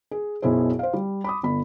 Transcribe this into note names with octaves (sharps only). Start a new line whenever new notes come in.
G#4
B1 F#2 B2 E4 G#4 C5
C5 F5
G3
B5 D6 D#6
G1 B5